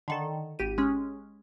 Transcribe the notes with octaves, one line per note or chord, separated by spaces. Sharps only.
D3 D#3 A4
G#1 G4 D#7
G#3 C#4